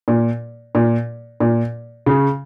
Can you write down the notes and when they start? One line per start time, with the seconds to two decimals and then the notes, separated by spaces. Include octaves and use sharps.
0.08 A#2
0.75 A#2
1.40 A#2
2.06 C#3